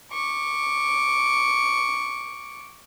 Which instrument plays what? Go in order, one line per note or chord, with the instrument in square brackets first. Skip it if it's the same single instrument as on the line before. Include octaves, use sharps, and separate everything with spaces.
[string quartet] C#6 D6